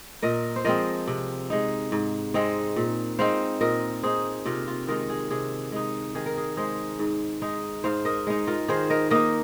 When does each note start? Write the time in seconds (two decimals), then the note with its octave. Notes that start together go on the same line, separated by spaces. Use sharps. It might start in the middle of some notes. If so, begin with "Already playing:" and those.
0.22 A#2 A#4 D#5
0.56 C5
0.64 F3 G#3 C4 A#4 D#5
1.07 C3
1.50 G#3 D#4
1.92 G#2
2.34 G#3 C4 D#4
2.76 A#2
3.19 G#3 C4 D#4 C5 F5
3.61 A#2 A#4 D#5
4.03 A#3 D#4 G#4 C5
4.46 C3 F4 A#4
4.67 F4
4.87 D#3 G#3 D#4 F4 A#4
5.09 G#4
5.30 C3 G#4
5.72 G#3 D#4
6.15 D#3 G#4
6.26 A#4
6.37 G#4
6.57 G#3 D#4 G#4 C5
6.99 G#2
7.42 G#3 D#4
7.84 G#2 C5 F5
8.05 A#4 D#5
8.27 G#3 D#4
8.47 F4 A#4
8.68 D#3 G#4 C5
8.90 A#4 D#5
9.10 A#3 D#4 A#4 D#5